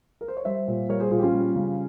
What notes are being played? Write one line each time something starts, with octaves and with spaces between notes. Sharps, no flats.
A#4
C5
C#5
G3 C5 E5
A#2
G3 A#4 C#5
G#4 C5
A#2 F4 G#4
G4
C#4 F4
G3
C#3